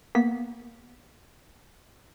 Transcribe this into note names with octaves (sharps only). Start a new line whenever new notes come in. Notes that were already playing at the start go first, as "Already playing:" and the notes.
A#3 B3 B6